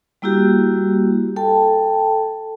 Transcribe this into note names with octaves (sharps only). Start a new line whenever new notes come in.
G3 A#3 E4 F#4 G4
A4 G5 A5